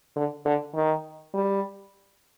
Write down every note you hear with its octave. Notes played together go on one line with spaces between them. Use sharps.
D3
D3
D#3
G3